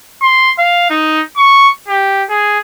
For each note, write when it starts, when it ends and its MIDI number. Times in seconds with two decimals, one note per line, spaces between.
0.21 0.52 84
0.59 0.88 77
0.90 1.22 63
1.36 1.69 85
1.88 2.23 67
2.29 2.58 68